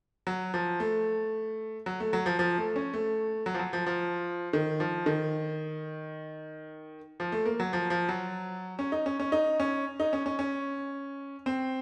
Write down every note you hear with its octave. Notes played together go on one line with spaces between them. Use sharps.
F#3
F3
A3
F#3
A3
F#3
F3
F3
A3
C#4
A3
F#3
F3
F#3
F3
F3
D#3
F3
D#3
F3
A3
A#3
F#3
F3
F3
F#3
C#4
D#4
C#4
C#4
D#4
C#4
D#4
C#4
C#4
C#4
C4